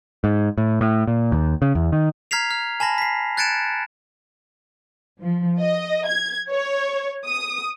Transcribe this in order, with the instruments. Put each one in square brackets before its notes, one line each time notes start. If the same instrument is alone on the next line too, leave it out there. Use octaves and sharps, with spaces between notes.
[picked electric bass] G#2
A2
A2
A#2
D#2
C#3
E2
D#3
[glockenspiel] A#5 F6 G#6 B6 C7 F7
F6
G#5 A5 B5 A#6
B6 C7
F#6 G#6 A6 C#7 D7 E7
[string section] F3
D#5
G#6
C#5
D#6